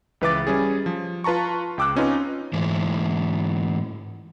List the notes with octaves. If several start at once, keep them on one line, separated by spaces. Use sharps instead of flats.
C#2 E3 B4 E5 D6 A6
G3 C#4 G#4
F3
F4 B4 A5 A#5 C#6
C#2 G5 D6 E6 F#6
C4 C#4 D#4 F4 B4
G#2 E3